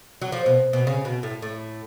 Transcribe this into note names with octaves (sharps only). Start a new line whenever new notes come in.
F#3
F3
B2
B2
C#3
B2
A2
A2